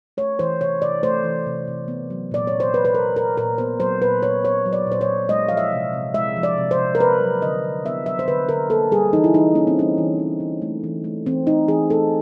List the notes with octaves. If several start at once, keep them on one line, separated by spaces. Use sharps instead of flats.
A3 C#5
E3 C5
C3 C#5
C3 D5
A3 C5
E3
C3
C3
B3
F#3
A#2 D5
A#2 C#5
C5
B3 B4
B4
F#3 A#4
A#2 A#4
A#2 A#4
B3 C5
F#3 C5
A#2 B4
A#2 C#5
B3 C#5
F#3
D5
A#2 C5
C#5
A#2
G#3 D#5
F3 F5
E5
C3
C3
G#3 E5
F3
D5
C3
C5
C3
A#4
B3 B4
F#3
D3 D#5
D3
B3 E5
F#3 E5
C5
D3 B4
D3 A#4
A#3 A4
G3 G#4
E3 D#4
E4
E3 D#4
A#3 C#4
C4
G3 C#4
E3
E3
E3
A3
E3
A3
E3 C4
A3 D#4
E3 G#4
A3 A4